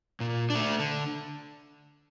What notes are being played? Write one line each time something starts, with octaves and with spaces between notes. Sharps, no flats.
A#2
D4
A3
D3